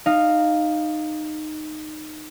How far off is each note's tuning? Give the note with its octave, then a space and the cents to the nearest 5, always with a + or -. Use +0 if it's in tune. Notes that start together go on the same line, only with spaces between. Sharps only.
D#4 -15 F5 +0